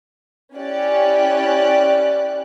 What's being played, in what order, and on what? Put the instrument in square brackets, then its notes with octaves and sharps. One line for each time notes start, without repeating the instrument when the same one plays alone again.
[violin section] C#4 E4 G4 D5 F#6